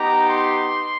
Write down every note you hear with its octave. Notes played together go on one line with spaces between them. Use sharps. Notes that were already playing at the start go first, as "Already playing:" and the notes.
Already playing: B3 D#4 G4 A#5
C6